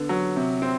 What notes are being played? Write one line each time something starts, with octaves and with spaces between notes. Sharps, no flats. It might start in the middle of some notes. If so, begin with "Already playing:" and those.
Already playing: D3 B3
F#3
C3
C4